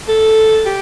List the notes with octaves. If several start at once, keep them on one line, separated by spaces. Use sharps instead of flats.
A4
G4